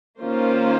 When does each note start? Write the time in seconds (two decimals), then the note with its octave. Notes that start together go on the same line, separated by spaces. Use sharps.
0.20 D#3 A#3 C#4 F4 C5